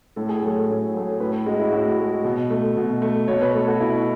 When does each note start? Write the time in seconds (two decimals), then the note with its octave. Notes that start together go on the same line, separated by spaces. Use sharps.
0.16 A2 A4
0.29 G#4
0.42 F#3 A3 A4
0.69 A2
0.94 F#3 A3
1.20 A2 B4
1.46 G#3 F#4
1.59 E4
1.72 A2 F#4
1.99 G#3
2.25 B2
2.50 A3
2.77 B2
3.02 A3
3.28 B2 C#5
3.42 B4
3.54 A3 A4
3.68 F#4
3.80 B2 E4